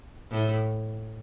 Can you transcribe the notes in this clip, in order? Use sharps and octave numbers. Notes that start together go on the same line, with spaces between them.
A2